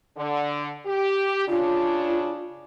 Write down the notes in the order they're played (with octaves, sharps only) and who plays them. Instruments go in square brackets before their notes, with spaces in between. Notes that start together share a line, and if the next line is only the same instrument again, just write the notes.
[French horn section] D3
G4
[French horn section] C#3 D4 [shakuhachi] F4